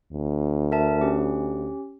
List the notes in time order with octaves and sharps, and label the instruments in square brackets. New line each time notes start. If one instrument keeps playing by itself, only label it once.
[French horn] D2
[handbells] A#4 E5 A5
C#4 G4